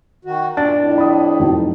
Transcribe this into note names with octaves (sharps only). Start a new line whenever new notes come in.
D#3 F#4
A#2 D4 A6
F2 A2
B5 D#6
F1 F#2 D#4